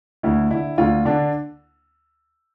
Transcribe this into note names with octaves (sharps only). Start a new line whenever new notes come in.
D2 E4
D3 E4
D2 F4
D3 D4